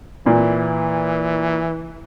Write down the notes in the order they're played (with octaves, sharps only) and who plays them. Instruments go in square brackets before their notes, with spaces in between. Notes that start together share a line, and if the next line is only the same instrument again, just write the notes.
[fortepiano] A#2 [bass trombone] E3